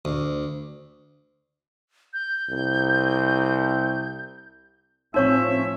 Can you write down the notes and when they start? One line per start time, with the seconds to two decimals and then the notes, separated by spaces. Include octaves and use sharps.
0.05 D2
2.14 G6
2.50 C2
5.14 A2 F3 C4 C#4 D#4 C#5 E5 C#6